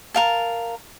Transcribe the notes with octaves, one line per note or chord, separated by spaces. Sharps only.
A#4 F5 A5